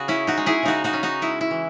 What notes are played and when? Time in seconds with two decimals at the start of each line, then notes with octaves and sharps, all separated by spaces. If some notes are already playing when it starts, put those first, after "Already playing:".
Already playing: C#3 F#4 G#4
0.08 C#4 E4
0.27 D#4 F#4
0.37 G#3
0.46 E4 G#4
0.63 C#3 D#4 F#4
0.84 D#4 F#4
0.93 C#4
1.03 D#4 F#4
1.22 G#3 E4
1.41 E4
1.51 E3